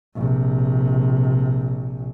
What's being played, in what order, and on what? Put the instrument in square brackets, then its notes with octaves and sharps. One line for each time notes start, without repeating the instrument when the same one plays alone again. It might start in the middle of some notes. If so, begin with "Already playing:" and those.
[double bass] A#1 C3